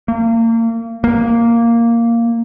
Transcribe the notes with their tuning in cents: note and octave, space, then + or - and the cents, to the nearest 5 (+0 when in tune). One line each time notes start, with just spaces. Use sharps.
A#3 -35
A#3 -5